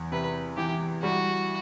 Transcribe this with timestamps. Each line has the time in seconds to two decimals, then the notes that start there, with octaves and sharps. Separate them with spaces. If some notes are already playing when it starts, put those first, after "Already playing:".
Already playing: E2
0.12 C3 B4
0.57 E3 G4
1.02 G3 F#4